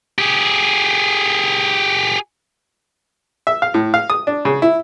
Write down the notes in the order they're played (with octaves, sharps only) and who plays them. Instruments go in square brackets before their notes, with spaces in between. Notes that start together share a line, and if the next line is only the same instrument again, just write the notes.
[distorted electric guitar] G4 G#4
[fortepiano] E5
F5
A2
F5
D#6
D4
C#3
E4